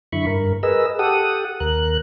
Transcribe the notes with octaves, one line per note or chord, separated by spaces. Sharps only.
F#2 D3 E4 B5 C#6
G2 A#4
G#4 A#4 B4 D#5 E6
G4 A4 F#5 D#6
D#2 A#4 F#6